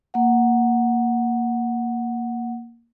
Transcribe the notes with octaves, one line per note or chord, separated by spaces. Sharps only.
A#3 F#5